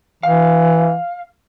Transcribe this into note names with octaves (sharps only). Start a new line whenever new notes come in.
E3 F5